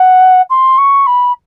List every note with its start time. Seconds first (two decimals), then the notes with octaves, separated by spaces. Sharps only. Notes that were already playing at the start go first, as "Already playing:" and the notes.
Already playing: F#5
0.50 C6
0.78 C#6
1.06 B5